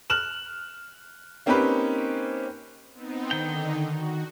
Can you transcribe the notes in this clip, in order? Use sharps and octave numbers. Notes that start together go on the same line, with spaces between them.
F6 F#6 E7 F#7
A#3 C4 C#4 D#4 G4 B4
B3 C4 D#4
D3 D#3 D#4 G5
F#4